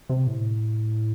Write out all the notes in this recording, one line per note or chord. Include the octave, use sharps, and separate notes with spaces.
C3
A2